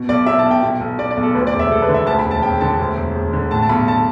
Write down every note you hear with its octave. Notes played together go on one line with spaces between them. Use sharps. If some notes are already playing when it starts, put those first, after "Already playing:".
Already playing: B2
B1 D5
B2 E5
A5
B1
G5
B2
B1
B2 D5
D5
B1
A4
D2 B4
D5
E1
E5
E1 A4
B4
D3
E5
D2 A5
B5
E1
A5
E1 G5
D3 A5
D2
E1
E1
D3
A2 A5
A5
B1 B5
A5